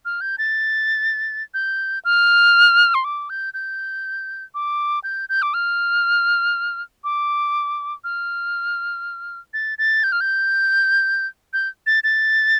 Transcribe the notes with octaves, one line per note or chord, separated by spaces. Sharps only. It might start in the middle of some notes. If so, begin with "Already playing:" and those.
F6
G6
A6
G6
F6
C6
D6
G6
G6
D6
G6
G6
D6
F6
D6
F6
A6
A6
G6
F6
G6
G6
A6
A6